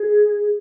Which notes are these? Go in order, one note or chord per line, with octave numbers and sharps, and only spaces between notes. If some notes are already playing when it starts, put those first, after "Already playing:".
Already playing: G#4